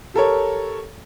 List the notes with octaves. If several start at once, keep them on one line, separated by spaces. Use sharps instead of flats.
G4 A4 A#4 C#5